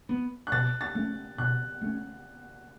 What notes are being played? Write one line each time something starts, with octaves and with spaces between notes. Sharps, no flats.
B3
F#6
B2 A6
A6
A3 C#4
B2 F#6
A3 C#4